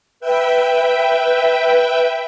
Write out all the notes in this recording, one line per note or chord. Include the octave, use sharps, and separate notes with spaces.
B4 E5 G5